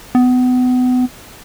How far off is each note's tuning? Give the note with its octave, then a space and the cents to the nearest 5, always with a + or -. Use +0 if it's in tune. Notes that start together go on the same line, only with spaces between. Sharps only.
B3 +30